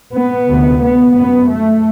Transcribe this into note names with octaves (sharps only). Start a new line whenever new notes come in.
B3
D2 C3
B3
F#2 B3
A3